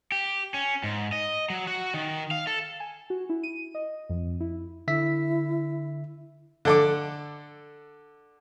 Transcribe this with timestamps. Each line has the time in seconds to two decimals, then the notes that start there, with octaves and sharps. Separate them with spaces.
0.12 G4
0.54 C#4
0.84 G#2
1.12 D#5
1.50 F#3
1.67 F#4
1.94 D#3
2.31 F5
2.47 A4
2.80 G#5
3.10 F#4
3.30 E4
3.43 D#7
3.75 D#5
4.10 F2
4.40 E4
4.88 D3 E4 E5 B6
6.65 D3 A4 D6